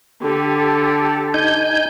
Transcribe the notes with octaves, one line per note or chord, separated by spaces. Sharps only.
D3 G4 A4
D#4 G#5 G6